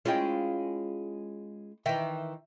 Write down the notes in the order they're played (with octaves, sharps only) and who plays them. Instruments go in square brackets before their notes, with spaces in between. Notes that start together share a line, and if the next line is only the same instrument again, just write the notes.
[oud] G#3 C#4 F4 [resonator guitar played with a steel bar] E4 D#5 G5
[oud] D#3 E3 [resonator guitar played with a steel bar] D#5 E5 G5